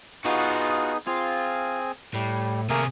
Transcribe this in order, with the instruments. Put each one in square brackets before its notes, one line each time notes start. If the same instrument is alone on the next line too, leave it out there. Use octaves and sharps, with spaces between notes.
[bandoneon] B3 D#4 G#4 [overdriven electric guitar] F4 F#4
[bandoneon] C4 G#4 G#5 [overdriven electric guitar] F4
[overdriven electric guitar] A2 [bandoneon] G3
[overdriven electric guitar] C3 G#4 [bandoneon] A3 A#3 A#4